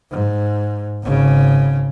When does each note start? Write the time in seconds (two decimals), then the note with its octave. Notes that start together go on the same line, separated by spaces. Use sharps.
0.10 G#2
1.03 G#1 C#3